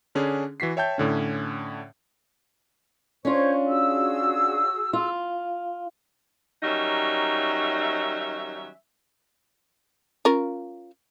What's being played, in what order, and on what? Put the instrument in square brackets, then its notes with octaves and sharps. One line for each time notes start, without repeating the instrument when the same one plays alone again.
[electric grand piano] D3 C#4 D4 G#4
E3 F#4 B6 C7
C#5 E5 G5 A5 G6
A2 D3 C#4
[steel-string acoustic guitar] C#4 D4 F4 [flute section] C5 C#5 C#6
[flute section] F#4 G#4 E6
[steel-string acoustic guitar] F4
[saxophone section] D#3 F#3 G3 C#4 D#4 E5
[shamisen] C#4 F4 A#4